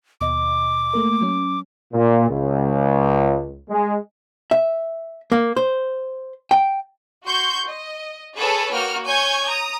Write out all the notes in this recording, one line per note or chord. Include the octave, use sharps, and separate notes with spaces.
D#2 B2 D#5 D6
A3 A#3 A#4
F#3 C#4
A#2
C#2
G#3
E5
A#3
C5
G5
F#4 C6 C#6 G6
D#5
G#4 A4 B4 C#5 A5 B5
A#3 F#4 G5 F6
C#5 G#5 C#6 G6 G#6
A#5 D#6